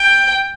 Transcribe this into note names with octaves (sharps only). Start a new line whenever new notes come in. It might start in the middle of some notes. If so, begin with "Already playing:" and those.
Already playing: G5